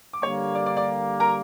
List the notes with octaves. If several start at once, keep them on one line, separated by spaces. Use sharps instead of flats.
D6
D3 G3 A#3 C#5 C#6
D5 D6
D5 D6
D5 D6
A#4 A#5